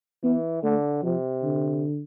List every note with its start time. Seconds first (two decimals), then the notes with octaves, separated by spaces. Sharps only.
0.23 E3 B3
0.63 D3 A3
1.03 C3 F3
1.43 D3